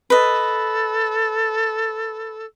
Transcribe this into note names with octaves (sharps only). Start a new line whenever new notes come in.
A4 B4 D#5